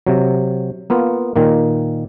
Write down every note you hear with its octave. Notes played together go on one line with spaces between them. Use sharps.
C3 F#3
A#3 B3 F4
A#2 D#3 A#3